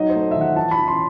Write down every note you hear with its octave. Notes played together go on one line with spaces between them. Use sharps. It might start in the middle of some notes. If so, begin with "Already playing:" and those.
Already playing: F#3 D#4 D#5
C5
A3
D#3 E5
F#5
E3 A5
B5
E3
C6